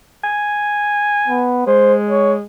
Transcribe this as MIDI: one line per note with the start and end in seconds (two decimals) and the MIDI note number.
0.24 1.51 80
1.28 1.62 59
1.67 2.44 56
1.67 1.95 72
2.10 2.32 73